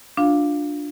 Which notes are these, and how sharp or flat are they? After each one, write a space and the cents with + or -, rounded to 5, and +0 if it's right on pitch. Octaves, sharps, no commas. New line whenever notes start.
D4 +0 F4 +30 F5 +0